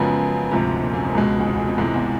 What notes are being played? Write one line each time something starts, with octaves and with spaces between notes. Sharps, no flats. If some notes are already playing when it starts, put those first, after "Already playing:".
Already playing: F#2 C#3 F3 G#3 B3
D2 G#2 C3 F3
A#2
F#2
F2
C#2 B2 G#3
E2
F2
F2
F2
G#2 C3 E3 G#3
E2